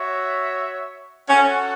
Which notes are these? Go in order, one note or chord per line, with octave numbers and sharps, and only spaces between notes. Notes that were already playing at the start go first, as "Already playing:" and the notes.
Already playing: F#4 C#5 E5
C#4 F#4 A4 C#5 F#5